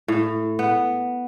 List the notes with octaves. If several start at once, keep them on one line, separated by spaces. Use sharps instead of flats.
A2
B3